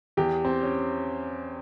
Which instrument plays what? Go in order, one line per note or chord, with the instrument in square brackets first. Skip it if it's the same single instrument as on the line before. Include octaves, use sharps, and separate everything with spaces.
[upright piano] E2 G4
C4
C#4